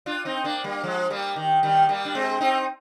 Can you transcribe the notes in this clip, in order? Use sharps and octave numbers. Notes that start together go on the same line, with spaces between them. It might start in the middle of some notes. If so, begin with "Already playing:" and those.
D4 F4
C4 D#4
A#3 D4
G3 A#3
F3 G#3
G3 A#3
D#3
D#3 G3
G3 A#3
D4
G#3 C4
C4 D#4